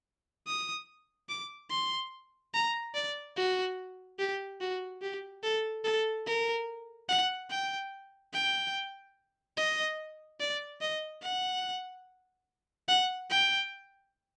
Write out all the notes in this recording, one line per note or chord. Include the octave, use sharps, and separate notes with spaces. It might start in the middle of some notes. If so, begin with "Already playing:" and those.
D#6
D6
C6
A#5
D5
F#4
G4
F#4
G4
A4
A4
A#4
F#5
G5
G5
D#5
D5
D#5
F#5
F#5
G5